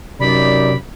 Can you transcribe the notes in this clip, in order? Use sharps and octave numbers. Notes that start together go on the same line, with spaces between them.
F#2 C3 D#4 G4 D5 B5